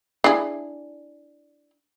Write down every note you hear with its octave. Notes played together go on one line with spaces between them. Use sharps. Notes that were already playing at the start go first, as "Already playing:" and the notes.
D4 E4 G#4